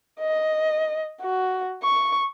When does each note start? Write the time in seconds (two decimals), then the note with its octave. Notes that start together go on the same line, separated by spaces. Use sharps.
0.20 D#5
1.21 F#4
1.83 C#6